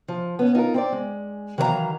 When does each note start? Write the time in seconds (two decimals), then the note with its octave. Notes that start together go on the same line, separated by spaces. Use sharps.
0.08 F3
0.39 B3 C#4
0.55 D#4 F4 A4 A#4
0.74 C4 C5 D5
0.92 G#3
1.58 D#3 E3 F#3 C#5 F5 A#5